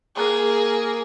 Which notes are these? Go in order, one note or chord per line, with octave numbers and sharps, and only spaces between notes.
A#3 G#4